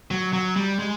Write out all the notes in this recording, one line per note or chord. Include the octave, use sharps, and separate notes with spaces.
F#3
F#3
G3
G#3